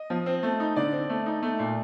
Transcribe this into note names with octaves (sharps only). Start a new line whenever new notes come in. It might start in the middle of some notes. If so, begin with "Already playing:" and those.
Already playing: D#5
F3
C4
A3
D#4
D3 D5
C4
A3
D#4
A3
A#2